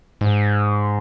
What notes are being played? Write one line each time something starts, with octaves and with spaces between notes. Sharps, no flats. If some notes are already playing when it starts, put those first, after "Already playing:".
G#2